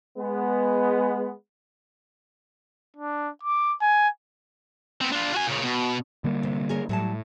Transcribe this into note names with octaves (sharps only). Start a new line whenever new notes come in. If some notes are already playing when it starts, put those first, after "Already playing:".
G#3 B3
D4
D6
G#5
B3 C4
D4 F4
F#4 G#5
A#2 C#3
B2
D3 G3 A#3
C3
G#4 A#4 C#5
A2 F#3 G3 A5